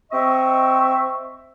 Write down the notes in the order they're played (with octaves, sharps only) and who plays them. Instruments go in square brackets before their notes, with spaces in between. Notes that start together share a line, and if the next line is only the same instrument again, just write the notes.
[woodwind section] C4 D#5 E5 C#6